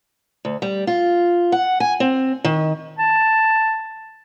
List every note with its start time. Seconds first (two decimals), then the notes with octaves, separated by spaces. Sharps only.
0.45 D2
0.62 G3
0.87 F4
1.52 F#5
1.80 G#5
2.00 C4
2.44 D#3
2.98 A5